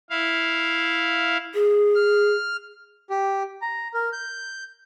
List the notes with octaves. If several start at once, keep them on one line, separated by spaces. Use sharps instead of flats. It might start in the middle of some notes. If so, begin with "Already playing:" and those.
E4 F5
G#4
F6
G4
A#5
A#4
G6